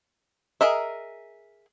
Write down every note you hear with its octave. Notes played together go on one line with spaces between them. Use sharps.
G#4 A#4 D#5 E5